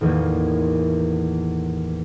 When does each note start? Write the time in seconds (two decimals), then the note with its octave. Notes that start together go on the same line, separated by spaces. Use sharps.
0.01 A1 E2 D#3 A#3 G6